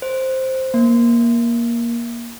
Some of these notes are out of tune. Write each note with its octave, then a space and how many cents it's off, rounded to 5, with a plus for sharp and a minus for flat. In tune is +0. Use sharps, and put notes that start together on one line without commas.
C5 +5
A#3 +15